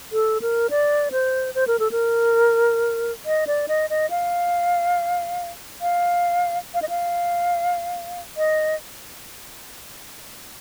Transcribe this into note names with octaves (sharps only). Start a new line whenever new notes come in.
A4
A#4
D5
C5
C5
A#4
A4
A#4
D#5
D5
D#5
D#5
F5
F5
F5
D#5
F5
D#5